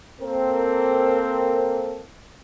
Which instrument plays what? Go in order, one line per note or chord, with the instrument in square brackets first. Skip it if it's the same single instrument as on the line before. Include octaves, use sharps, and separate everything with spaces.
[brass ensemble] A#3 C4 A4 A#4